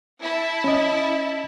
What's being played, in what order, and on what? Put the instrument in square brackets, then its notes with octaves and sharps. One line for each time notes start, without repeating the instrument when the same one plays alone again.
[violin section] E4 A5
[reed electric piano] C#4 D#5